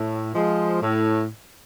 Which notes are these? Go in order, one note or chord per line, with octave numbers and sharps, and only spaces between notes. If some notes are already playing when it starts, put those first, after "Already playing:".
Already playing: A2
F3 G#3
A2